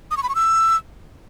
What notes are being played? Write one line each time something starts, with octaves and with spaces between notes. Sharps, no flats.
D#6
C#6
B5
C#6
E6